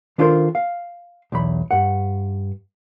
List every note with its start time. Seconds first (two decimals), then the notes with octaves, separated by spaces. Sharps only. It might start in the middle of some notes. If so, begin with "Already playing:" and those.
0.18 D#3 D4 F4 A4 A#4 C5
0.55 F5
1.32 B1 E2 B5
1.71 G2 F#5